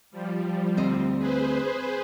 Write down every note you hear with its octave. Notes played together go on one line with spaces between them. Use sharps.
F3 G3
D2 C4 D#5
G#4 B4 C5